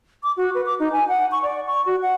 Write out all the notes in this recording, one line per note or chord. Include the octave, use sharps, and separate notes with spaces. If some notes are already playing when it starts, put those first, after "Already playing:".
D6
F#4
B4
D6
D#4
G#5
F#5
C#6
D5
C#6
F#4
F#5